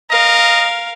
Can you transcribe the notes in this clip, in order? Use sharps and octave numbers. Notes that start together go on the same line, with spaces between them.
A#4 D#5 F5